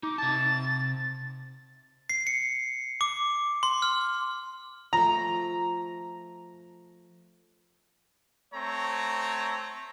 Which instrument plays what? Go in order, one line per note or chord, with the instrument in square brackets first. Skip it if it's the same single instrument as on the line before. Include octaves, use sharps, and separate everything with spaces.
[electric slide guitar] D#4 [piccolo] D6
[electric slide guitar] C3 A5 [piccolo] A6
[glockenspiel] C7
C#7
D6
C6
F6
[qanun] F3 A3 [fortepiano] A#5
[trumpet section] A3 C4 C#5 A#5